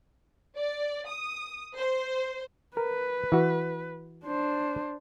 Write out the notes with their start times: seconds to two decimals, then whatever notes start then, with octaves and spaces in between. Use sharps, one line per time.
0.56 D5
1.07 D#6
1.76 C5
2.77 A#4 B4
3.32 E3 F#4
4.26 D4 C5